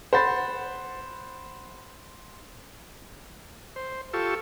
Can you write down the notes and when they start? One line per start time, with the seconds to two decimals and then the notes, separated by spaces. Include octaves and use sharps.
0.13 C5 F#5 B5 A6
3.76 C5
4.13 F4 G4 A4 C#6 E6